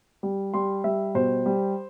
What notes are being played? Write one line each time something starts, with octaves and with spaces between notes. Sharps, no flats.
G3
G3 C6
G3 E5
B2 C5
G3